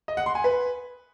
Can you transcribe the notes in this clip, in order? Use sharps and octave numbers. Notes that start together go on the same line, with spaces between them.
D#5
F#5
C6
G#5
B4